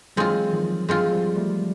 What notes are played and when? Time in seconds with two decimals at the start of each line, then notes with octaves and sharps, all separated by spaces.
0.16 E3 F#3 G#3 C4 F4
0.52 D#3 F3
0.89 G#3 C4 F4
1.12 F3 G3
1.36 G3 A3